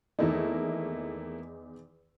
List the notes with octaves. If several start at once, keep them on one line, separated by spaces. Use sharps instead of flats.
E2 D#3 A3 A#3 D#4 E4